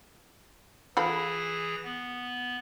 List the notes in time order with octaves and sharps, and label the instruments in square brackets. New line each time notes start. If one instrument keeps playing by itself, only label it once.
[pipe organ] E3 G#4 A#6 [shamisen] F4 A4 B5
[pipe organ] B3